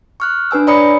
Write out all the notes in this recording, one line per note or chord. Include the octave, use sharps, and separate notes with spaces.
C#6 F6 F#6
D4 B4 G#5 E6
C#5 D5 A#5 B5 D#6 C#7